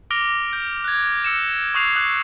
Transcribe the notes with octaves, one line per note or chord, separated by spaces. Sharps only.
D6 F6 A#6 D7 F7 G7
G6
F#6 G#6
E6 C#7 E7
C#6 D#6 F#6 C7 F7
D#6 F#6